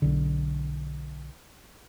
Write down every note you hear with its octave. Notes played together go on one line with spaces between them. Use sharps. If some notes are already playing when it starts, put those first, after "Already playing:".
B1 D3